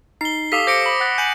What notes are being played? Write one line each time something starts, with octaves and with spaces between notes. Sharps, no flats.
D#4 C7 G7
G4 A4 F5 D6 D#6 B6
C5 D6 A#6 C#7 D7
B5
F#5 F#6 A6
G#5 G6 F#7